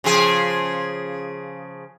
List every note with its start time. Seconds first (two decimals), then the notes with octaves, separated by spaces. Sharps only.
0.04 C#3 F3 G#4